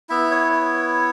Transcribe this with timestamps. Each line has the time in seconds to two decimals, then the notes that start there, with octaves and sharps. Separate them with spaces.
0.09 B3 E4 E5
0.31 C#5
0.52 C#5